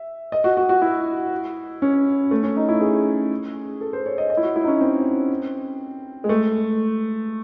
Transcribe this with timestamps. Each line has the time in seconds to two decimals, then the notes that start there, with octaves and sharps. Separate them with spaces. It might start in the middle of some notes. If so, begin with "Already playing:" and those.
Already playing: E5
0.32 D#5
0.44 F#4
0.57 F#4
0.69 F#4
0.82 E4
1.82 C#4
2.31 A3
2.43 C#4
2.57 D#4
2.69 E4
2.81 G#4
3.81 A4
3.93 C5
4.06 C#5
4.18 D#5
4.30 D#5
4.37 E4
4.43 F#4
4.56 E4
4.64 D#4
4.68 C#4
4.81 C4
6.24 G#3
6.29 A3